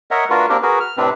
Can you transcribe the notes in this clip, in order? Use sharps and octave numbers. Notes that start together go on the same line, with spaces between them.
A#4 C#5 D#5 E5 F#5
A3 D4 F4 F#4 A#4 B4
A#3 C4 D4 G4 A#4
F#4 G#4 A#4 B4
F6
A2 C3 C4 D4 B4